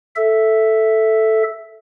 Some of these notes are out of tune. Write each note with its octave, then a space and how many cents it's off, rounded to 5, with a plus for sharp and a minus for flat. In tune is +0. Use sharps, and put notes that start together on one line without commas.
A4 +0 E5 +0